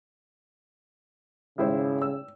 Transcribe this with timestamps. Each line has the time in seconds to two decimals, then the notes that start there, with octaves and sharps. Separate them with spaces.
1.58 G#1 C#3 E4 C5
2.02 E6